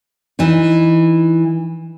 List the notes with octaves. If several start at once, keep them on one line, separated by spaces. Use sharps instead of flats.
E3 D#4